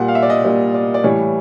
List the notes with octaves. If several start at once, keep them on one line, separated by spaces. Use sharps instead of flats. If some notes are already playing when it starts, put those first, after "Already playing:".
Already playing: A#2 G3 F#5
F5
E5
D5
D#5
A#2 G3 D5
D5
D5
A2 E3 G3 C#5